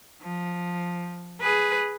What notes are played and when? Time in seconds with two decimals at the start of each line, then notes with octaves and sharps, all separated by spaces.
0.22 F3
1.41 G#4 B4